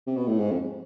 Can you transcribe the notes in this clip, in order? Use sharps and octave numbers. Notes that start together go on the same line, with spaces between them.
C3
B2
A2
G#2
F2